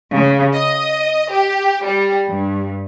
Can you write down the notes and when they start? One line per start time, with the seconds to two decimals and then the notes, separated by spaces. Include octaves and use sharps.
0.15 C#3
0.56 D#5
1.32 G4
1.85 G3
2.28 G2